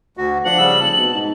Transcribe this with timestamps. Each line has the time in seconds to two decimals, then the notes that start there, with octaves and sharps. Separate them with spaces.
0.17 D2 F#4
0.45 F3 D4 F#5 F#7
0.58 C#3 G3 E6
0.81 F1 A5
0.99 B2
1.14 G#2